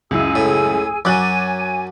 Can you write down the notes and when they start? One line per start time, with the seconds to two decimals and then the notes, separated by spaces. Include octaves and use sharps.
0.11 C#2 F#2 E4 G#4 G#5 E6
0.35 A2
1.05 F#2 F#3 G#5 D6 F#6 A6